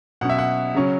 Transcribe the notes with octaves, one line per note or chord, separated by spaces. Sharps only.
B2 F#3 C#4 F#5
E5
F#5
C#3 F#3 C#4